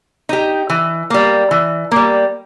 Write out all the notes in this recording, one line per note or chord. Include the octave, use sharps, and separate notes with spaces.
D#4 G4
E3
G3 A#3
E3
G3 A#3